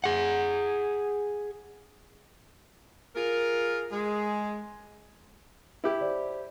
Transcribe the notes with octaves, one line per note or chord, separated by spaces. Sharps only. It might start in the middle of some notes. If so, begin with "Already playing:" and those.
G#4 F#5
F4 G#4 A#4
G#3 G#4
E4 G4
C5 D5